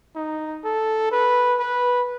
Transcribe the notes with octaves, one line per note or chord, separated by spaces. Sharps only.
D#4
A4
B4
B4